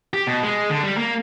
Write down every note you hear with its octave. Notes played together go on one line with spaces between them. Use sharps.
G4
B2
G#3
D3
G3
A#3